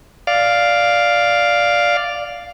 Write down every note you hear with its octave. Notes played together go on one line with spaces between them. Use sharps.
D5 F5